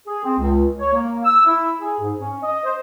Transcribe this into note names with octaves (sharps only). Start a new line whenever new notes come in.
G#4
C4
C#2
C#5
A#3
E6
E4
G#4
G#2
C#4
D#5
C5